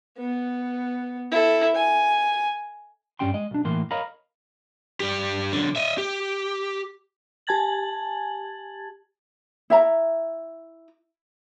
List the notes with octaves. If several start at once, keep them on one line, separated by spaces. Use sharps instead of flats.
B3
E4 A4
G#5
G2 D#3 G3 C#4 G5 C6
G#3 D#5
B1 D4
A2 E3 A#3 C6
A#4 C#5 D#5 F5 A#5 B5
G2 G4
B1 D3
D#5 E5
G4
G4 G#5 A5 G#6 A6 F#7
E4 E5 A#5